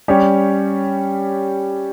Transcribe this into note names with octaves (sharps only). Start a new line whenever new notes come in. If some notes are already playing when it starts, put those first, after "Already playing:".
G3 C#4 G4 C#5